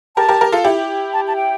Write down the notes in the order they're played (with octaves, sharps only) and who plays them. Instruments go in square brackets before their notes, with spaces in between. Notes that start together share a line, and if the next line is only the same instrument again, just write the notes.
[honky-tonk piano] G4 A#4 [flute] A5
[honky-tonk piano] G4 A#4
G4 A#4
F4 A4
E4 G4
[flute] A5
A5
G5